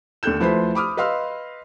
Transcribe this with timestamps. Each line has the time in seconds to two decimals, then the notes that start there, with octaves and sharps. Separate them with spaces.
0.23 D#2 D3 A4 F#6 G6 E7
0.40 D2 F3 E4 B4 C5 B5
0.75 B5 D6 D#6 F6
0.97 B4 D#5 F5 C6 E6 F6